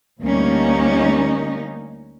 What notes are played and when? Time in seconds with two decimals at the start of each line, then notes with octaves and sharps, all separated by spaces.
0.22 D2 G3 A#3 C#4 D#4